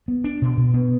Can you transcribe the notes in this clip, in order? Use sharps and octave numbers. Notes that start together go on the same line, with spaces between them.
B3
D4
B2
B2
B3